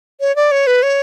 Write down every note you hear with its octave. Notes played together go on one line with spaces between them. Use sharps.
C#5
D5
C#5
B4
C#5